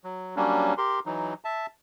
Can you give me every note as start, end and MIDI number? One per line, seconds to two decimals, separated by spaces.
0.04 0.36 54
0.36 0.74 54
0.36 0.74 55
0.36 0.74 58
0.36 0.74 61
0.36 0.74 62
0.78 1.00 67
0.78 1.00 70
0.78 1.00 84
1.06 1.34 52
1.06 1.34 54
1.06 1.34 63
1.45 1.66 76
1.45 1.66 81